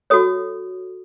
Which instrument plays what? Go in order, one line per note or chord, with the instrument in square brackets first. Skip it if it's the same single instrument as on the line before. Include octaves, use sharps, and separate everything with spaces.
[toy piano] F#4 A4 C#5 D#6